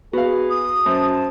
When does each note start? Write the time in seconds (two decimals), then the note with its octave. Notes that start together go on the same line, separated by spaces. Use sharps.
0.13 B3 F#4 G#4 F5
0.50 D#6
0.86 F#2 C5 A5